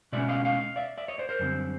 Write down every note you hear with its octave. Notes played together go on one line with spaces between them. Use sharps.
B2 G#3 C#4 D5 E5
D#5 F5
D#5 F5
D5 E5
D5 E5
C#5 D#5
C5 D5
A#4 C5
F#2 D3 G3 C4